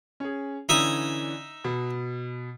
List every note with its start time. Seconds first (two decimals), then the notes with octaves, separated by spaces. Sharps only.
0.20 C#4 G#4
0.69 D3 E3 C#4 D#4 E5 D#6
1.64 B2